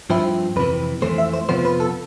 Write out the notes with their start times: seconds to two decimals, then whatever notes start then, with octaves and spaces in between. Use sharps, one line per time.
0.10 G2 F3 C4 E4
0.56 F2 C3 E3 B4
1.02 F2 E3 A3 C5
1.18 E5
1.33 C5
1.49 F2 C3 F3 B3 C5
1.65 B4
1.80 A4